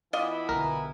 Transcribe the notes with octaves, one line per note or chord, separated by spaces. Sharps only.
E3 B3 E4 F4 D5 D#5
B1 D3 A#4